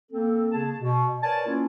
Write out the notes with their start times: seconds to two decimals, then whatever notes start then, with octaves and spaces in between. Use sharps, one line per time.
0.11 A#3 C4 A4
0.52 C#3 A#3 G#4 A5
0.79 B2
1.22 A#4 B4 C#5 D5 G#5 A5
1.46 A#3 C#4 E4 F4